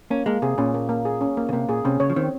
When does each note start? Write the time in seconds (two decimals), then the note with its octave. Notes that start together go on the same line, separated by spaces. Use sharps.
0.10 A#3 C#4
0.26 G#3 A#3
0.42 C3 G#4
0.58 A#2 C#4
0.74 A#3
0.89 A#3
1.05 G#4
1.21 C#4
1.37 A#3
1.49 C#3
1.53 C3 A#3
1.69 A#2 G#4
1.85 C3 C#4
2.00 C#3 C#5
2.10 F3
2.16 D#3 C4